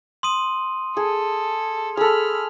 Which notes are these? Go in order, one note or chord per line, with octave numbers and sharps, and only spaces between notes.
C6 D#6 D#7
G#4 A4
G#4 A4 B5 F6